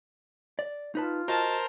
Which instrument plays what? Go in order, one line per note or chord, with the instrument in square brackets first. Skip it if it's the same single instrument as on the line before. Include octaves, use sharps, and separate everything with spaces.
[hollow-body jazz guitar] D5
[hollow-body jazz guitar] D#4 B4 A5 [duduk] F4
[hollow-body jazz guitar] F#4 D#5 [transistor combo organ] A#4 C5 [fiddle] A5